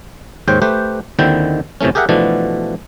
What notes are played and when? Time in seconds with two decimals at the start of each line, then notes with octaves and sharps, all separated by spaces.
0.48 D#2 G#2 C5 C#5 G5
0.62 A3 G4 B4 C5
1.19 D#2 D3 D#3 C4 E4 G5
1.81 F2 C3 E3 A3 C#4
1.95 G4 G#4 A#4 E5 F#5
2.09 B2 E3 F3 A3 B3 D4